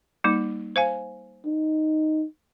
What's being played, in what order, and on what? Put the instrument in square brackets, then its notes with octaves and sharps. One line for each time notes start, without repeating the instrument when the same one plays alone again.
[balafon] G3 A#3 D#4
C5 F5 G#5
[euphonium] D#4